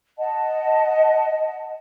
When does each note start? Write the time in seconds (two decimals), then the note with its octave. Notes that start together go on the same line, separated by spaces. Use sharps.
0.17 D#5 F#5 A5